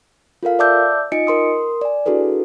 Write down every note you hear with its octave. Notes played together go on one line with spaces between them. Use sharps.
F4 A4 A#4 F5
D5 E5 A5 D6 E6 G6
D#4 F4 D#5 G#5 C#7 D7
A#4 C6 D#6
D5 G#5
D4 E4 F#4 G#4 A4 B4